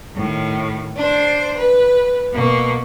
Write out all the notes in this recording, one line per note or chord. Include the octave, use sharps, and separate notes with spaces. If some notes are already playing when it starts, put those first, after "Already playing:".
A2 D#3
D4 C5
B4
B2 A#3